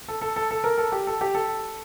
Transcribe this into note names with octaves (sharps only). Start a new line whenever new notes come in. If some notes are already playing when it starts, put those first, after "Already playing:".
A4
A4
A4
A4
A#4
A4
G4
A4
G4
A4